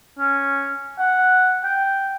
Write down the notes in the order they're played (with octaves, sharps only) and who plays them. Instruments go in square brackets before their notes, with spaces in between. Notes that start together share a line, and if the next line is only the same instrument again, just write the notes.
[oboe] C#4
F#5
G5